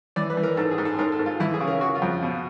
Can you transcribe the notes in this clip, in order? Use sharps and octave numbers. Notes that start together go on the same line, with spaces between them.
E3 D5
B4
E3
A#4
G#2 A4
G#4
G#2
A4
G#2 A#4
A4
G#2
F4
E3 E4
G#4
C#3
A#4
C#3 F#4
F4
F2
B2